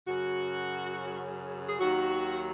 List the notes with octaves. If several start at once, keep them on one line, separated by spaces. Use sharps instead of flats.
F#2 C#3 F#3 F#4
G#4
D#2 D#3 F#3 F#4